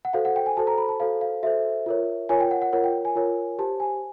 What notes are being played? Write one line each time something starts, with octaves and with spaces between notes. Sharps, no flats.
F#5
F#4 A4 C5 F5
F#5
G5
G#5
F#4 A4 C5 A5
A#5
B5
A5
F#4 A4 C5 F5
F5
F#4 A4 C5 E5
F4 A#4 C#5
F4 A#4 C#5 G#5
G5
F#5
F#5
F4 A#4 C#5 F#5
G5
G#5
F4 A#4 C#5
G4 C5 A5
G#5